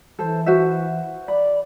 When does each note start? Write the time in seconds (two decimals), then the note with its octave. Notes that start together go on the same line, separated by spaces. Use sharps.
0.19 E3 A4 C5
0.46 F#4 C5 E5
1.28 D5 B5